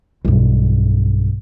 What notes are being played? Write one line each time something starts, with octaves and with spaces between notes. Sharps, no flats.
B1 G2